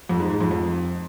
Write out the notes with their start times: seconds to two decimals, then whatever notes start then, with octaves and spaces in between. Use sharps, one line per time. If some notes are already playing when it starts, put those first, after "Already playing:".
0.09 F2
0.20 G#2
0.30 G#2
0.41 F2
0.51 F2